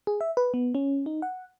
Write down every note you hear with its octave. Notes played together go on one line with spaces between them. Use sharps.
G#4
E5
B4
B3
C#4
D#4
F#5